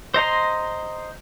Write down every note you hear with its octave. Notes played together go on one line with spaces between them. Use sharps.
C5 D#5 A#5 C6